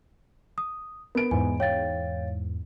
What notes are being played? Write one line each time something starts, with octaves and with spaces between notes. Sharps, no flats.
D#6
B3 A#4 D7
E2 G#2 G#5
C#5 F5 G5 A6